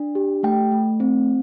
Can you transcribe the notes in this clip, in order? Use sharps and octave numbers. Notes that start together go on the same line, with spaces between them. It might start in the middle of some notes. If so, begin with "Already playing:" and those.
Already playing: D4
G4
A3 G5
A3
C4